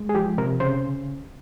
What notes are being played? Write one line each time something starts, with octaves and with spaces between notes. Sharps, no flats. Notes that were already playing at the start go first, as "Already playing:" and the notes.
Already playing: G#3
G#4
F3 G4
C3 A#4
C#3 C5